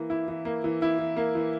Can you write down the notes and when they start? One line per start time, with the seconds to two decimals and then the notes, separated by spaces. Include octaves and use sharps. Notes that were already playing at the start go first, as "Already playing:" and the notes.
Already playing: E3 A#3
0.10 E4
0.28 E3
0.45 A#3
0.64 E3
0.82 E4
0.99 E3
1.17 A#3
1.35 E3